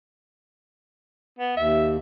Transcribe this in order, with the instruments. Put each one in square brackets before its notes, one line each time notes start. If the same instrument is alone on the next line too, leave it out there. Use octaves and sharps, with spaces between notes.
[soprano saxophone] B3
[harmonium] D#2 [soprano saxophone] E5